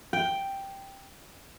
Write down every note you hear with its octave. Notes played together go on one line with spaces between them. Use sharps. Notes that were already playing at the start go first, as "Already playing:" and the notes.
G5